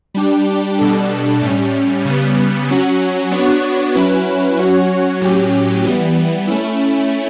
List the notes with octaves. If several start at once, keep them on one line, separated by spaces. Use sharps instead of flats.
G3 D4 G4
B2 G3 D4 A4
A2 G3 C#4
C#3 G3 B3
F#3 C#4 F#4
B3 D4 F#4 C#5
F#3 C#4 E4 B4
F#3 C#4 F#4 C#5
A2 F#3 C#4 G4
E3 G3 B3
A3 C#4 E4